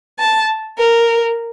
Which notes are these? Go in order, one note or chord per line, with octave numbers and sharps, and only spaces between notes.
A5
A#4